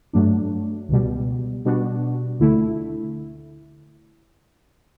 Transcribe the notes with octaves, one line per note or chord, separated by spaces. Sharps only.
G2 F#3 A3 D4
C#2 B2 G3
B2 G3 D4 F#4
D2 D3 A3 E4